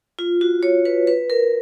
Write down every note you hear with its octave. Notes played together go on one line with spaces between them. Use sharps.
F4
F#4
C#5
B4
B4
A#4